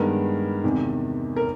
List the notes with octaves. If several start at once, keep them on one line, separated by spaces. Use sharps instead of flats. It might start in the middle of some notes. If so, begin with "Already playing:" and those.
Already playing: G2 D#3 G#3 B3 A#4
E2 C3 D#3
A#4